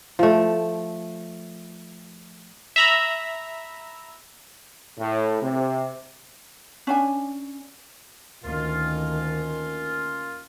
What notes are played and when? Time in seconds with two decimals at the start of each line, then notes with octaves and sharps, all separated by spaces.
0.19 F3 A3
2.76 E5 A#5 B5
4.98 A2
5.42 C3
6.87 C#4 D4 G#5
8.44 D2 D#3 A#3 C#4 F4